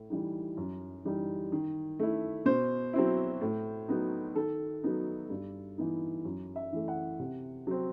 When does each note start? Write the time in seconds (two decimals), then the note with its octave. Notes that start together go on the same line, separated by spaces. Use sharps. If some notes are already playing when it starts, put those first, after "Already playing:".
Already playing: A2
0.10 E3 G3 D#4
0.57 F#2
1.05 E3 G3 D#4
1.52 D#3
1.99 A3 E4
2.46 B2 C5
2.93 F#3 C4 E4
3.41 A2
3.88 F#3 B3 D#4
4.35 D#3 A4
4.83 F#3 B3 D#4
5.30 G2
5.78 E3 B3 D#4
6.25 F#2
6.56 E5
6.73 E3 A3
6.88 F#5
7.19 C3
7.67 F#3 C4